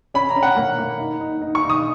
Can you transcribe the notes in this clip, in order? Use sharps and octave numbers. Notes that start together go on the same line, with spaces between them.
C#4 B5
A#5
C#4
F#5
A#3
A#3
D#4
D#4
D#4
C#6
D#4
D#6